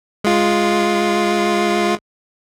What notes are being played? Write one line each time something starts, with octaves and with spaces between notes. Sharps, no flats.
G#3 F4